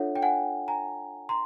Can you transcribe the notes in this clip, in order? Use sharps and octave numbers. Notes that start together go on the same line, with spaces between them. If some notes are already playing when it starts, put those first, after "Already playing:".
Already playing: D4 F4 A4 C#5 E5 F#5
G5
F#5 G#5
G#5 A#5
A#5 C6